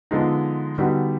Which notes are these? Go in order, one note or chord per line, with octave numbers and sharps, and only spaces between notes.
D3 F3 G#3 B3 D#4
D3 G3 B3 D#4 F#4